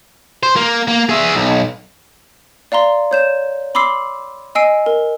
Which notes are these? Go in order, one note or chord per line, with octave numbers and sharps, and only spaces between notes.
C5
A#3
A#3
G#4 E5
B1
D5 F5 A#5 C6
C#5 G6 E7
B5 C6 D6 E6 C7
D#5 G#5 E6 C7 D7
A#4